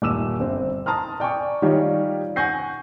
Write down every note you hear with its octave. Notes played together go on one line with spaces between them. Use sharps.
D#1 D6 E6 E7
G1 C4
A5 A#5 C6 D#6 F6
D5 G5 G#5 C#6
D#3 G3 D#4 F4 G4 C#5
F#5 G#5 C#6 G6 A#6 C7